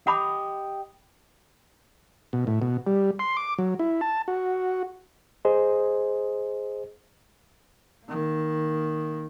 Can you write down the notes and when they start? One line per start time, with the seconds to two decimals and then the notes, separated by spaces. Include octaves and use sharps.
0.07 G4 D#5 F#5 B5 D6
2.33 B2
2.47 A2
2.62 B2
2.87 G3
3.19 C6
3.37 D6
3.58 F#3
3.79 E4
4.01 A5
4.28 F#4
5.45 G#4 C5 D#5
8.06 D#3 A#3